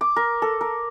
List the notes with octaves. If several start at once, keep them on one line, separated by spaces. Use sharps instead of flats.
D6
A#4
A4
A#4